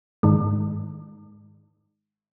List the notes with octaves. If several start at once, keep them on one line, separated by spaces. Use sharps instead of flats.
G#2 D#3 G#3